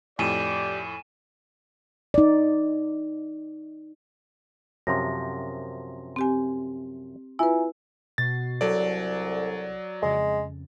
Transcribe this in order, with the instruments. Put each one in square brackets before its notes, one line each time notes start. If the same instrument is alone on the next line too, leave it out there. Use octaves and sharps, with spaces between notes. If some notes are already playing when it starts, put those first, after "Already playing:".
[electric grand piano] F2 A2 [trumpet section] G4 D5 [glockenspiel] G#5 D#7 E7
[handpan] D#4 D5
[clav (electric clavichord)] F#2 C3 F3 [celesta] C6 A#6
[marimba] C4 G4 G#5
[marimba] E4 B4 [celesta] F4 E5 G#5
[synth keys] B2 F#4 C7 [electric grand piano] A6
[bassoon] C2 [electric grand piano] F#3 D5 [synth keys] A4
[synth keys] F2 C#3 [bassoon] G#3